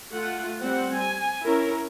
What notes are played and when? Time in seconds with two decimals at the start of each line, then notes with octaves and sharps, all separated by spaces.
0.14 A3 F4 F#5
0.60 G3 C4 F#5
0.95 G#5
1.43 C#4 E4 A#4